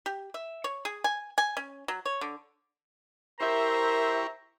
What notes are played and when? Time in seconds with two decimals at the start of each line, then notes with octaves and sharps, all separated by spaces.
0.06 G4
0.34 E5
0.64 C#5
0.85 G#4
1.04 G#5
1.38 G#5
1.57 C#4
1.88 F#3
2.05 C#5
2.21 D3
3.41 E4 G4 A#4 C5 E5 A#5 C#6